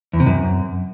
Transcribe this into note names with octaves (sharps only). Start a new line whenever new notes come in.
E2
C3
F#2